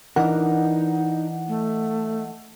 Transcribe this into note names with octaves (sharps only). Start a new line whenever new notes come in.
E3 D4 D#4 A#4 D#5 F#5
A3